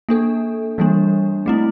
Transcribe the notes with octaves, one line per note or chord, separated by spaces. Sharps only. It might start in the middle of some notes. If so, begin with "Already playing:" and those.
A#3 D4 A4
E3 G3 A#3 D4
A3 C4 E4